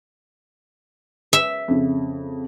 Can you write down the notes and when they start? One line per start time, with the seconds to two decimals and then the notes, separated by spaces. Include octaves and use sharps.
1.33 E5
1.68 F2 C#3